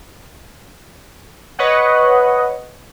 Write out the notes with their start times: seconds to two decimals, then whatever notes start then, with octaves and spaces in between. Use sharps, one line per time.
1.59 B4 C#5 D#5 F#5